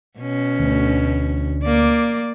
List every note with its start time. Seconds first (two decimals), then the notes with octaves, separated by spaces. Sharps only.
0.19 B2 C#4
0.59 D2
1.63 A#3 D5